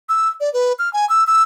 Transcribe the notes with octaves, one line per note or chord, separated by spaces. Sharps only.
E6
D5
B4
F6
G#5
E6
E6